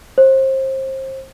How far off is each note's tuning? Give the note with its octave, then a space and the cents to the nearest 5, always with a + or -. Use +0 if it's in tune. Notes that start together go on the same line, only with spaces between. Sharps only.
C5 +30